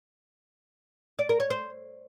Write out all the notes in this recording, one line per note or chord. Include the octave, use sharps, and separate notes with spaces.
D5
A#4
C#5
C5